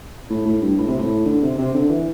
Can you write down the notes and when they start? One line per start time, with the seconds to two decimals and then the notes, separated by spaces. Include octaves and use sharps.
0.30 A2
0.45 A2
0.62 G2
0.78 A2
0.88 C3
0.98 A2
1.26 D3
1.42 C3
1.58 C3
1.74 D3
1.89 E3